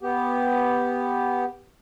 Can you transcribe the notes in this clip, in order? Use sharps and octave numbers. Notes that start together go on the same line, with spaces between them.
B3 G4